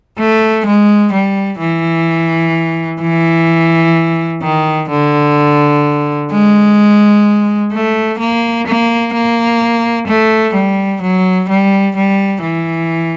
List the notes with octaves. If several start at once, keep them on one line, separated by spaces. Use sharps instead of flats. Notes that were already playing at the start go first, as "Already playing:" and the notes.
A3
G#3
G3
E3
E3
D#3
D3
G#3
A3
A#3
A#3
A#3
A3
G3
F#3
G3
G3
E3